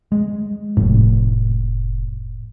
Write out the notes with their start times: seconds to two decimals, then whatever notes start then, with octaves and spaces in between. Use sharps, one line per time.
0.12 G#3
0.77 F1 A2